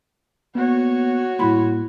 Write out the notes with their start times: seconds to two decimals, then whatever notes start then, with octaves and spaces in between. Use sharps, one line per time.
0.55 A#3 B3 F#4 C#5
1.39 A2 G3 A#3 E4 B5 C6